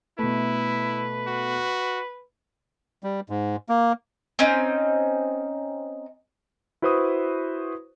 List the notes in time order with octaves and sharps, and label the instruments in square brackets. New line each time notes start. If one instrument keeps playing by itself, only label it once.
[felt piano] B2 A3 [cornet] E4 [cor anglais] B4
[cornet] F#4
[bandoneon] G3
G#2
A#3
[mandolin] C4 C#4 D#4
[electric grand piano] E4 F#4 B4 C5 C#6 D#6